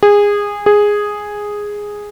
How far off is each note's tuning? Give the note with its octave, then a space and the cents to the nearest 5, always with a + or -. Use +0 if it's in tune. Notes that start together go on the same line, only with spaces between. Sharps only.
G#4 -20
G#4 -5